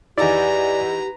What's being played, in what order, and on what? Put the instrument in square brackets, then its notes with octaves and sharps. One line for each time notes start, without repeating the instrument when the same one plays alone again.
[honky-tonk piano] E2 D#4 E4 [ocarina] G4 [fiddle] B4 A#5 [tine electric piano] D5 G#5